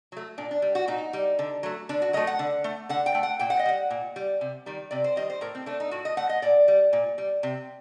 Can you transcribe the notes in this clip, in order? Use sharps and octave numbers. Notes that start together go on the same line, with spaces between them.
F#3 A3
A#2 D4
D4
G3
F#4
A#2 D#4
G3
D3
F#3 A3
D3 D4
F#4
F#3 A3 D#5
F#5
D3
A3
D3 F#5
G5
A3
F#5
A#2 G5
F#5
D#5
G3 F#5
A#2
G3
C3
D#3 G3
C3 D5
C5
D#3 G3 D#5
C5
A2 A#4
C4
A3 D4
D#4
A2 F#4
D#5
A3 F#5
D#5
A#2 D5
G3
A#2
G3
C3